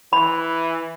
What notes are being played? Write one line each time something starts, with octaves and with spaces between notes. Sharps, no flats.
E3 B5